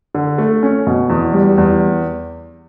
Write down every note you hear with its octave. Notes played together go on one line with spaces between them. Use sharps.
D3
A3
C#4
B2
E2
G3
E2